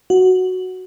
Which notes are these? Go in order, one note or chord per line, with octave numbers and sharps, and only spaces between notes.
F#4